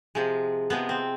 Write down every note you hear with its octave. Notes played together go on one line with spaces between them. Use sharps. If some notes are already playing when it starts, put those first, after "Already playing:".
C3 F3 G#3
C3 F3 G#3 B3
C4